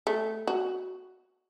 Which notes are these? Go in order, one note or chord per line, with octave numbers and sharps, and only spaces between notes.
A3
F#4